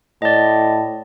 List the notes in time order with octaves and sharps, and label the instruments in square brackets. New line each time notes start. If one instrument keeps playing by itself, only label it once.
[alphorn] A2 [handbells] D5 D#5